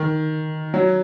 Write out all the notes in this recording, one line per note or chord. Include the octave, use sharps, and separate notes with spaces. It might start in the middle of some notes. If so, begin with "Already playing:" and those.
Already playing: D#3
F#3